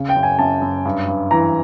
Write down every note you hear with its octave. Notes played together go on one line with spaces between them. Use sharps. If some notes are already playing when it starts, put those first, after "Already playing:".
Already playing: C#3
G5
F#2
G#5
F#2 A5
F#2
G2
G2
E3 A#5